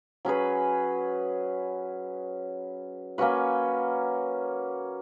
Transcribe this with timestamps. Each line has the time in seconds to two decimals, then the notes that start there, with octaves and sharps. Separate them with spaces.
0.25 F#3 C#4 G#4 B4
3.18 A#3 C#4 F#4 B4